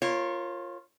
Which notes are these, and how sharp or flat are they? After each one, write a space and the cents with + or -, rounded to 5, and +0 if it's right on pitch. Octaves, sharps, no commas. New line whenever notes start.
F4 +0 A#4 +5 C#5 -30